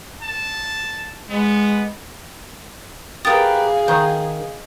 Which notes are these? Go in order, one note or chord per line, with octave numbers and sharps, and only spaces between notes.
A5
G#3 B3
G4 G#4 A#4 B4 F5 D#6 A6
D#3 D#5 G6